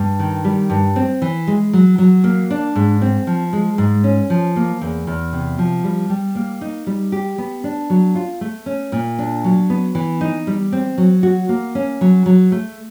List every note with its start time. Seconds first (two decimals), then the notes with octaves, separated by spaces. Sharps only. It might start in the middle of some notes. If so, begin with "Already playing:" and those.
Already playing: G2
0.19 D#3
0.45 G3
0.70 G2
0.96 C4
1.22 E3
1.47 G#3
1.73 F#3
1.98 F#3
2.24 A#3
2.50 D4
2.76 G#2
3.02 C4
3.27 F3
3.53 G#3
3.78 G#2
4.04 C#4
4.30 F3
4.56 A#3
4.81 E2
5.07 E2
5.33 C3
5.59 F3
5.84 G3
6.10 G3
6.35 A#3
6.61 D#4
6.87 G3
7.12 G4
7.38 B3
7.64 D4
7.90 F#3
8.15 F4
8.41 A3
8.66 C#4
8.92 A#2
9.19 D4
9.44 F#3
9.70 B3
9.95 E3
10.21 D#4
10.47 G3
10.72 C4
10.98 F#3
11.23 F#4
11.49 A#3
11.75 C#4
12.01 F#3
12.26 F#3
12.52 A3